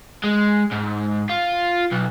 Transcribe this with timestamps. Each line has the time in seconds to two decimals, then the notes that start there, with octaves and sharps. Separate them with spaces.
0.23 G#3
0.71 G#2
1.29 F4
1.92 B1